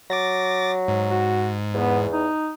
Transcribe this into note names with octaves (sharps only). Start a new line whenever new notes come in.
F#3 D6 A6 A#6
G#2
F#4
E2 B3
D#4